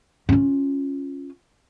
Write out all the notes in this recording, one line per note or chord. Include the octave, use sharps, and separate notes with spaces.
C#4 F4